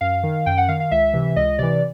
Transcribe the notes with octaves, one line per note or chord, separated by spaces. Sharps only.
F#2 F5
D#3
F#2 G5
F#5
D#3 F5
F5
C#2 E5
C3 E3
C#2 D#5
C3 E3 D5